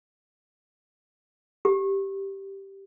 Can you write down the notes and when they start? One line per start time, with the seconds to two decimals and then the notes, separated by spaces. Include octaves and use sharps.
1.65 G4